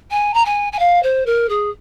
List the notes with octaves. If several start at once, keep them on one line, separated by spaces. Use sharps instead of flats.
G#5
A#5
G#5
G#5
F5
C5
A#4
G#4